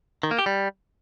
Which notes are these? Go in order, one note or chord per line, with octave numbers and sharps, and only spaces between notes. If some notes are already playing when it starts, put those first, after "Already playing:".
D#3
A#3
G4
G3